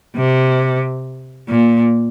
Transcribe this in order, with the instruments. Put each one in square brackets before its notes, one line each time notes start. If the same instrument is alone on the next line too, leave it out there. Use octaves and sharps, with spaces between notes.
[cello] C3
A#2